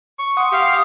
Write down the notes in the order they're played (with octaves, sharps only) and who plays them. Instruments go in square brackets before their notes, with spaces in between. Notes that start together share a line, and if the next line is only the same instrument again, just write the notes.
[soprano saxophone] C#6
[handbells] F#5 C6 D#6
[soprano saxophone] G4 [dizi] F5
[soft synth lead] D#6